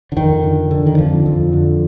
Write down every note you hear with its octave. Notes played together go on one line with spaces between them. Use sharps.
D3
F2 D#3
D3
D3
D#3
F2 F3
F2
D3